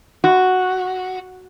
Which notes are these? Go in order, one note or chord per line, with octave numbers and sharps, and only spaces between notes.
F#4